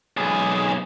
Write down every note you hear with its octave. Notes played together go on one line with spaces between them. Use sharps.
B1 G#4